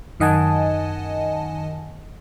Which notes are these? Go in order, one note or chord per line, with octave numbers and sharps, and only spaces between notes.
F#2 D#3 D#5 F#5 G#5 A5